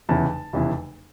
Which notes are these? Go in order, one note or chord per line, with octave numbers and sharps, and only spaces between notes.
F1 E2 C#3 E3 A5
F1 E2 C#3 E3